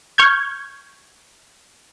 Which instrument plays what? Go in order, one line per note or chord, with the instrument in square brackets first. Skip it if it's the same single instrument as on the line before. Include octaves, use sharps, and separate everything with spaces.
[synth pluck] C#6 F6 G6 G#6